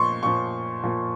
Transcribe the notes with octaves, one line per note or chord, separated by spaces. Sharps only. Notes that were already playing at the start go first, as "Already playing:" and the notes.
Already playing: A#2 F3 C6 C#6
A#2 F3 C#6
A#2 F3